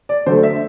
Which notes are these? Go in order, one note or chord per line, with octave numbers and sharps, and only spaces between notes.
D5
D3 F#3 A3 C5
E5